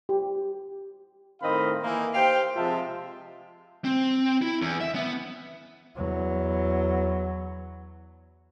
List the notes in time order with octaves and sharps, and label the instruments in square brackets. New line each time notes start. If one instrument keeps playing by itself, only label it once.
[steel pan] G4
[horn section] A2 D#3 C4 D#5 F5 B5
E3 A#3 D#4
G4 C5 F5 G5
C3 F3 G#3 F4 E5 A5
[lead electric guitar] C4
E4
E2
E5
B3
[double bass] E2 F#3